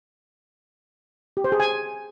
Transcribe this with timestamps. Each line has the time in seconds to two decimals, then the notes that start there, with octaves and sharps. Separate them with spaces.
1.37 G4
1.44 C5
1.52 G#4
1.60 G#5